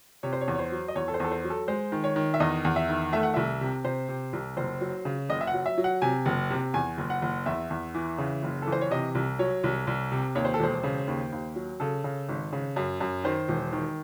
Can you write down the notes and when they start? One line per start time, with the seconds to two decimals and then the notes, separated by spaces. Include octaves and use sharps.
0.23 C3 C#5
0.33 C5
0.41 C#5
0.48 E2
0.55 C#5
0.59 C5
0.72 F#3
0.88 D#5
0.95 E2 C#5
1.08 A4
1.14 C5
1.20 E2 A4
1.32 C5
1.44 F#3
1.50 A4
1.68 G#3 C5
1.92 D#3
2.04 C#5
2.16 D#3
2.34 E5
2.40 E2 D#5
2.65 E2
2.76 E5
2.89 D#3
3.12 A3 E5
3.23 F#5
3.34 C2 E5
3.61 C3
3.84 C3 C5
4.09 C3
4.33 C2
4.57 F#1 C5
4.81 F#3
5.05 C#3
5.29 F#1 D#5
5.41 E5
5.47 F#5
5.54 F#3
5.66 E5
5.78 F#3
5.84 F#5
6.02 C3 G#5
6.26 F#1
6.50 C3
6.74 E2 G#5
6.98 F#1
7.10 F#5
7.22 F#1
7.46 E2 E5
7.70 E2
7.95 E3
8.18 C#3
8.43 F#1
8.62 A4
8.67 E3
8.72 C5
8.81 C#5
8.91 C3 D#5
9.15 C2
9.39 F#3 C#5
9.64 C2
9.87 C2
10.12 C3
10.35 D#2 C#5
10.45 C5
10.54 A4
10.59 E1 C5
10.83 C#3
11.07 D#2
11.32 D#2
11.55 F#3
11.80 C#3 A4
12.04 C#3
12.29 G#1
12.53 C#3
12.76 F#2
13.00 F#2
13.24 D#3 C5
13.48 E1
13.73 D#3